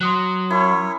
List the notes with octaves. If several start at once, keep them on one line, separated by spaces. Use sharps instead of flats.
F#3 C6 D#6 F#6
C#4 E4 A#4 C#5